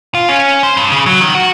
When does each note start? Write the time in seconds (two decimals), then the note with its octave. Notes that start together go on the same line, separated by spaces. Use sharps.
0.15 F4
0.29 C#4
0.63 C5
0.77 G2
0.91 C#3
1.06 F#3
1.21 D#3
1.35 F#4